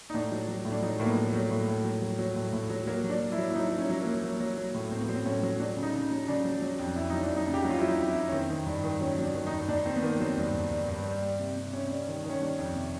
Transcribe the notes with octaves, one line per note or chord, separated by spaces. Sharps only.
D#4
A2 D4
F#3
F#3
A2
D4
F#3 D#4
A2 A#3
B3
F#3
A3
F#3
A2
A2
F#3
F#3
F#3
A2
A2
F#3
F#3 A#3
F#3
D4
F#3
E4
F#3
E4
F#3 D#4
F#3
C#4
F#3
A#3
F#3
F#3
F#3
F#3
A2
A2 C4
B3
F#3 C4
A2 C#4
F#3
F#3 D4
C#3
D#4
C#3
F#3
C#3 D4
F#3
F#3
F2
F2 E4
F#3 D#4
D4
F2
D#4
C#3
G4
F#3 F#4
F4
F#3 E4
D#4
F2
E4
F2
C#4
D#3 C4
D#3
G2
D#3
F#3 C#4
F#3
D4
D#3
D#4
G2
G2 D4
D#3 C4
B3
D#3 A#3
F#3 C4
G2
G2
G2
G2
G3
G3
C3
C3
C3 C#4
G3
D#3
D#3
C#4
G3 D4
F2
C3